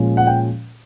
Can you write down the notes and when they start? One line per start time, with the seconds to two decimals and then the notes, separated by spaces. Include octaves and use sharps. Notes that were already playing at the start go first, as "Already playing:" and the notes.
Already playing: A#2 F3 G#3 C#4
0.17 F#5
0.27 G5